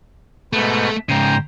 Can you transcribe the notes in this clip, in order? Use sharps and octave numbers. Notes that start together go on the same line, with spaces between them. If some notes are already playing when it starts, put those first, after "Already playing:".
G#2 B2 A3 B4
G#2 C#3 C5 G5 A#5